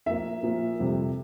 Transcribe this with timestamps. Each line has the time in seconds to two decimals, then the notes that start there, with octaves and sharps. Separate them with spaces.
0.06 A#2 F3 A#3 E5
0.43 A#2 F3 A#3
0.79 F2 C3 G3